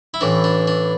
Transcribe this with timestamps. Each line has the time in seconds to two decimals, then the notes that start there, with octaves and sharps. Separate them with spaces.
0.14 E4
0.21 A1 A2 E3 D4
0.44 D4
0.67 D4